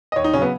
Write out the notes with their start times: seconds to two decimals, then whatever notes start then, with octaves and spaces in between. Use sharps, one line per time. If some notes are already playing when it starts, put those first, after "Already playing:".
0.12 D#5
0.16 D#2 C#5
0.24 D#4
0.33 C#3 C#4
0.36 F#3
0.42 B3